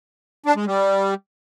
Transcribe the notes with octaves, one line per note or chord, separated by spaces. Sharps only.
D4
G#3
G3